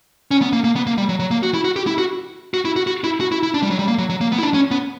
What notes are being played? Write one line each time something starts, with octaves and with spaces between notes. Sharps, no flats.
C#4
B3
A#3
A#3
B3
A#3
G3
F#3
F#3
A#3
F#4
E4
F#4
G4
E4
F#4
F#4
E4
F#4
F#4
E4
F#4
E4
E4
D4
G3
F#3
G3
A#3
F#3
F#3
A#3
B3
E4
D4
C#4
B3